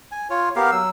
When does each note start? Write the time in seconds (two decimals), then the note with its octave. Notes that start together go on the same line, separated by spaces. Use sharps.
0.12 G#5
0.30 F4 C#5
0.56 B3 G4 A#4 F5
0.72 F#3 E6